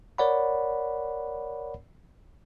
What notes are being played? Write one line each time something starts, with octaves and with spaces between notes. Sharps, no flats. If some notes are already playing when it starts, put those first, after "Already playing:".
A#4 C#5 D5 F#5 B5